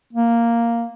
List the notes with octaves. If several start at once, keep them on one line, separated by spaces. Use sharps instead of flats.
A#3